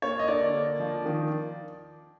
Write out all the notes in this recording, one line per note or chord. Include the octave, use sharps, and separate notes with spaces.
A#3 C#5
D#5
D3 D5
A#3
F3
D#3